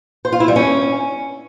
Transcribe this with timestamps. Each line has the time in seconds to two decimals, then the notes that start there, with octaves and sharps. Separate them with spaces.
0.25 C5
0.32 F4
0.40 E4
0.48 G3
0.56 C#4